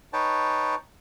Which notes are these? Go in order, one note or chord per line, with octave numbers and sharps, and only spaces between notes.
D#4 B4 C#5 G5 A5